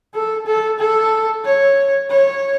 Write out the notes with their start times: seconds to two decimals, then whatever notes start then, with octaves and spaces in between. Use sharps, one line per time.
0.14 A4
0.47 A4
0.79 A4
1.45 C#5
2.10 C#5